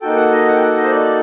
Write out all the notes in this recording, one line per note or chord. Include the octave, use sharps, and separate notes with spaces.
A#3 D#4 F#4 A4 G5
F#5
D#5
F#5
G5
F#5
D#5
C5
D5